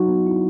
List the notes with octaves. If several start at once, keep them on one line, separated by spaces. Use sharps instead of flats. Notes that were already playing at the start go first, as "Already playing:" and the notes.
Already playing: F#3 D#4 F#4
B3
E4